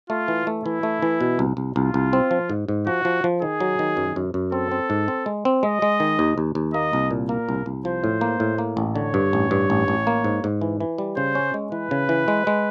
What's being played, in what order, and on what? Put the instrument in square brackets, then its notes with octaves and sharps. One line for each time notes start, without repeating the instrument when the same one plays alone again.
[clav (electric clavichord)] A3 [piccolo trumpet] F4
[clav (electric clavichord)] E3
A3
[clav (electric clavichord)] E3 [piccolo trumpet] E4
[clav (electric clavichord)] A3
E3
B2
C2
C2
[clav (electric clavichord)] C2 [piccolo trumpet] F4
[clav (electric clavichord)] C2
C4
F3
G#2
G#2
[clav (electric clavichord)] F3 [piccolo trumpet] F#4
[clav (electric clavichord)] F3
F3
[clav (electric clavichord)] D#3 [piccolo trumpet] G#4
[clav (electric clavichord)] F#3
D#3
F#2
F#2
F#2
[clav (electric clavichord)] C4 [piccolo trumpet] A4
[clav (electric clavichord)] C4
G#2
C4
G#3
C4
[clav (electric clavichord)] G#3 [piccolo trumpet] D#5
[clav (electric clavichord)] G#3
D#3
D#2
D#2
D#2
[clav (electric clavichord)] A#3 [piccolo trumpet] D#5
[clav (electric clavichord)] C2
A#2
[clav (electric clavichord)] A#3 [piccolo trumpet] A#4
[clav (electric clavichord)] C2
C2
[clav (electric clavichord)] F3 [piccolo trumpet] C5
[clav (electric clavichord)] A2
A#3
A2
A#3
A1
[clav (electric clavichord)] D3 [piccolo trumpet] C#5
[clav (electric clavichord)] G2
A1
G2
A1
A1
A#3
G#2
G#2
E3
E3
G3
[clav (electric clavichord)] C#3 [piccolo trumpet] C5
[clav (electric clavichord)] C#4
G#3
[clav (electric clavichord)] E3 [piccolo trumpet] B4
[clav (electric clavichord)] C#3
E3
G#3
G#3